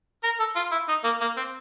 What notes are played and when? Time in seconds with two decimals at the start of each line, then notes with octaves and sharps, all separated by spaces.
0.24 A#4
0.39 A4
0.56 F4
0.72 E4
0.88 D#4
1.04 A#3
1.21 A#3
1.37 C4